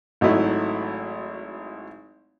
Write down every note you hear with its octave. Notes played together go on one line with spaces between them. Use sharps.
G#1 F#3 A3 D#4 E4